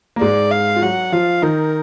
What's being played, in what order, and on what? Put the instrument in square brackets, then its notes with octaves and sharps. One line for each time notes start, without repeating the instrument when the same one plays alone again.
[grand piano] A#3
[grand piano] G#2 G#3 [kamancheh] D5
[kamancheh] F5
[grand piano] F4
[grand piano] F#3 F#4 [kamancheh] F#5
[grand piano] F3 F4 [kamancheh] F5
[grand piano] D#3 D#4 [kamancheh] A#4